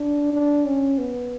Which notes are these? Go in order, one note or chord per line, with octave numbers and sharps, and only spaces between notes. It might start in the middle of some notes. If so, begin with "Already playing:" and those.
Already playing: D4
D4
C#4
B3